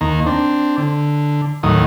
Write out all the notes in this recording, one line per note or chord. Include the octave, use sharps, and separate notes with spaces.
D#2 D#3 A#3
C4 D4
D3
D#2 A2 D#3 F#3 D#6